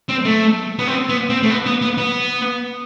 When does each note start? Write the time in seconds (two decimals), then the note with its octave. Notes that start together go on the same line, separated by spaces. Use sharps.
0.09 C4
0.25 A3
0.79 B3
0.87 C4
1.09 B3
1.30 C4
1.43 A3
1.50 B3
1.66 B3
1.82 B3
1.98 B3